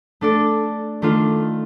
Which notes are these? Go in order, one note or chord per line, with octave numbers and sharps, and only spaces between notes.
A3 D4 A4 D5
D#3 A3 D4 F4